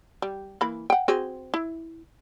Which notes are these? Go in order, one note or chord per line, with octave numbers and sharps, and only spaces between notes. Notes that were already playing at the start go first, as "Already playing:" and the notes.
G3
E3 A#3 B5
F#5 G5
C4 F#4 G#4
E4